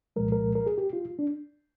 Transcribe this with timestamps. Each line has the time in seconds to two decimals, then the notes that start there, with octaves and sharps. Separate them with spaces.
0.16 C2 A#2 F3 G#3 A#4
0.32 A#4
0.55 A#4
0.66 G#4
0.78 G4
0.93 F4
1.19 D4